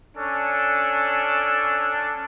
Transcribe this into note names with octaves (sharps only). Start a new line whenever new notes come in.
C#4 D4 A4